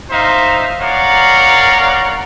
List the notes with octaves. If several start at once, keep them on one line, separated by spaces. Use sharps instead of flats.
D#4 C5 E5 F5
A#4 C#5 D5 F5 F#5